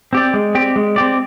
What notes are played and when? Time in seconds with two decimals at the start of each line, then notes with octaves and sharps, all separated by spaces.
0.13 C4 G4 D5
0.34 G#3
0.55 C4 G4 D5
0.76 G#3
0.96 C4 G4 D5